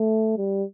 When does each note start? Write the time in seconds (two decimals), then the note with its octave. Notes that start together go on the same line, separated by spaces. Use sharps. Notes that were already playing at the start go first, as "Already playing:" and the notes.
Already playing: A3
0.37 G3